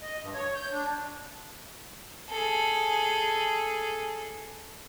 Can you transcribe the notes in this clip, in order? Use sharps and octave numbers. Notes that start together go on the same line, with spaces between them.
D#5
G2
C#5
G6
D4
G#4 A4